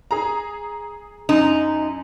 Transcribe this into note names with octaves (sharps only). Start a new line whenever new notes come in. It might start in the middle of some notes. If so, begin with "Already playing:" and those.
G#4 A#5
F#2 D#4